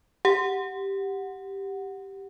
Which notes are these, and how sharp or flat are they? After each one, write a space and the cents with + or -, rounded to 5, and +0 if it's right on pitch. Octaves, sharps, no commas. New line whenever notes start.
G4 +0 F#5 +0